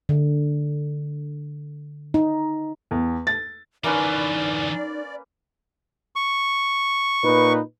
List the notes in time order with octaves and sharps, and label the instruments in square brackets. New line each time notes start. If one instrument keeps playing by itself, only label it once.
[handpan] D3
D#4
[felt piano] E2
A6
[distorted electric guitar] D3 E3 [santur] A#3 C#4 B4 [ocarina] D#4 [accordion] D5
[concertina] C#6
[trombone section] A#2 D#4 B4